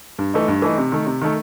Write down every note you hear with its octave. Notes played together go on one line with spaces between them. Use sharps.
G2
E3 A3 D#4
G2
E3 A3 D#4
C3
D#3 A3
C3
D#3 A3